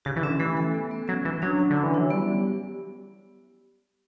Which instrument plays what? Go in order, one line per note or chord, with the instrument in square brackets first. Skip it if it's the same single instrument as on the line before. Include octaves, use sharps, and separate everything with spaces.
[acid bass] C#3 [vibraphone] G4
[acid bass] E3
[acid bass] D3 [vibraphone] C#4
[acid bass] E3 [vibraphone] A3
[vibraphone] A4
B3
B3
[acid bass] F#3 [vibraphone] C#4
[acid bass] E3 [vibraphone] C#4
[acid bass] F#3 [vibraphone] D4
[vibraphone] D4
[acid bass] D3
[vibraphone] C#4
[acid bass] E3
[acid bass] F#3 [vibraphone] E4
[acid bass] G3 [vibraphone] B3